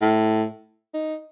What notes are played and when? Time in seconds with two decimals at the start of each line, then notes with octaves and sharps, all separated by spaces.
0.02 A2
0.94 D#4